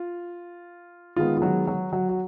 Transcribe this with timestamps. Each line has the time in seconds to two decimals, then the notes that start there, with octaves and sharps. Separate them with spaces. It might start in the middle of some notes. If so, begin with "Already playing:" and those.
Already playing: F4
1.16 D#3 G#3 B3 F4
1.37 F4
1.42 F#3 F#4
1.67 F#3 F#4
1.92 F#3 F#4
2.09 F#4